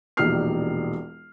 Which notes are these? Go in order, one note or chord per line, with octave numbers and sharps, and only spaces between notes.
E1 A#1 D#4 G4 F6 C7